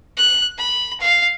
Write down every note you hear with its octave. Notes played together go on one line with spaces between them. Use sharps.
F#6
B5
F5